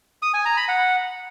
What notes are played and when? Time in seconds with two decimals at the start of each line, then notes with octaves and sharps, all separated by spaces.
0.22 D#6
0.34 G#5
0.45 A#5
0.57 B5
0.68 F#5